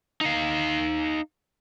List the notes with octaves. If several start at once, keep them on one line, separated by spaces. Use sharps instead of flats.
D#4 F5